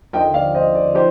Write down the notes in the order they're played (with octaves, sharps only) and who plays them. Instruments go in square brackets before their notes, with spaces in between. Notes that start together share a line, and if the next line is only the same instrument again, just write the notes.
[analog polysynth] D#2 D3 F3 [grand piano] D#5 G5
[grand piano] D5 F5
C5 D#5
D5
[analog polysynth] F3 D#4 G4 [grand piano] C5